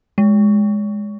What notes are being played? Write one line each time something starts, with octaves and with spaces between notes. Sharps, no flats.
G#3